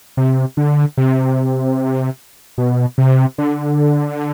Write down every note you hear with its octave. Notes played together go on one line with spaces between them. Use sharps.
C3
D3
C3
B2
C3
D3